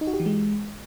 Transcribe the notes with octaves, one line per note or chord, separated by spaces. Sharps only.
D#4
F#4
G4
E3
G#3